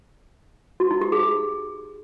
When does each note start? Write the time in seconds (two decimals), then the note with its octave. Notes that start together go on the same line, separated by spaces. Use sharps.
0.80 F#4
0.91 D#4
1.01 G4
1.12 G#4
1.23 G#4